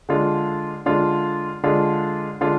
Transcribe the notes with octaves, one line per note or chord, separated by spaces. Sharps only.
D3 G#3 D4 F4
D3 G#3 D4 F4
D3 G#3 D4 F4
D3 G#3 D4 F4